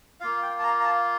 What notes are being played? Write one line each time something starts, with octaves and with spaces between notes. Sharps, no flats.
A#3 F4 F5
G5
A5
A#5
A#5
A5